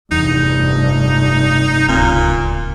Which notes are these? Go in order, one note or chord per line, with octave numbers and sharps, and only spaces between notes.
F1 E2 G2 D#4
D1 C#2 A#2 C4